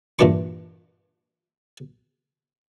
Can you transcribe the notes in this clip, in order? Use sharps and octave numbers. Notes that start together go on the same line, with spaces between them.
G2 A#2 E3 D4 C#6